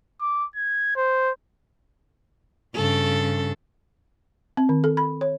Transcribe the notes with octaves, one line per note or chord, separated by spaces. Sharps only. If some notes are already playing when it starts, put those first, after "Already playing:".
D6
G#6
C5
G2 C#3 A4
C4
D#3
A4
B5
C#5